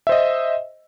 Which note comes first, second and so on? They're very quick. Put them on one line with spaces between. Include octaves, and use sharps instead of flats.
E5 C5 D#5